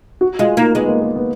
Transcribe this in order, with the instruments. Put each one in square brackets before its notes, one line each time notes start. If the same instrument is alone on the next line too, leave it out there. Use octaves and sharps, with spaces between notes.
[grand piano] F#4
[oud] G#3 [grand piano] F4
[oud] A#3 [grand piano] D#4
[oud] G#3 [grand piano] B3
[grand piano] A#3
A#3
B3